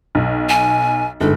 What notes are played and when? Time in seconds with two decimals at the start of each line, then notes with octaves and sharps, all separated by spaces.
0.15 B1
0.49 G#5
1.21 G1 G#2 A4